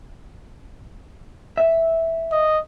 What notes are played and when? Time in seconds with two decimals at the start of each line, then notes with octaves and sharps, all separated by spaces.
1.58 E5
2.32 D#5